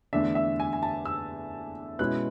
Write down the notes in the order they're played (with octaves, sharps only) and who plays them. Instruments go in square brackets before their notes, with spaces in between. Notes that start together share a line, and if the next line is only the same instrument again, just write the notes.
[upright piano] E2 D3 A3 D4 E5
E5
G#5
G#5
A5
E6
B2 G#3 C#4 E4 F#6